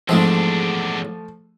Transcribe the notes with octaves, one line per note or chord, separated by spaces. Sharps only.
E2 G#2 F3 G#3 A3 C4 D4